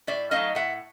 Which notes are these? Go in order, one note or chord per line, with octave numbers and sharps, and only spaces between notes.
A2 D5 E5
F#3 A3 C4 D#4 D#5 F5
A2 E5 F#5